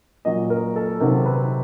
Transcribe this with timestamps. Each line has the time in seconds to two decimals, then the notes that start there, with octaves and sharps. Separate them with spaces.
0.25 A#2 F#3 D#5
0.50 A#4
0.76 A4
1.00 C3 D#3 F#3 A#4
1.26 B4